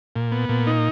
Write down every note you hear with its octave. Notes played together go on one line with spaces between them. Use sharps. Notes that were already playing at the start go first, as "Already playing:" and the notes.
A#2
B3
A#2
D#4